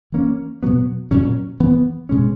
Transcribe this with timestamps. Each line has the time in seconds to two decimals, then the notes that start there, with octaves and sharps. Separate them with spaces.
0.12 E3 A#3 C#4
0.63 B2 F#3 B3
1.11 A#2 F#3 C#4
1.60 E3 B3
2.09 B2 G#3 C#4